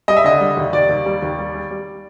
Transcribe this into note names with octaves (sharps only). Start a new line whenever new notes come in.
G3 D#5
E5
D3 D#5
G3
D#2
D#2 D5
D#2
G3
D#2
G3
G3
G3